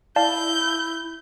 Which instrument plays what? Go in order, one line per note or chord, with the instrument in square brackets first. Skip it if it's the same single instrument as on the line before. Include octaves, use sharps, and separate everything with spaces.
[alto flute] E4 [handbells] D5 F5 A5 [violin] G6